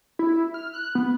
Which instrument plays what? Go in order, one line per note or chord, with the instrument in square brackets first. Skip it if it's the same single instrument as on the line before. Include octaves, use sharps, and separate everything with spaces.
[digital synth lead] E4
F6
F#6
B3